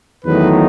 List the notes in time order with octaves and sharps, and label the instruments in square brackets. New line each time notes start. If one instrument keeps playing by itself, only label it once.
[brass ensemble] E2 D#3 F#3 A3 D#4 B4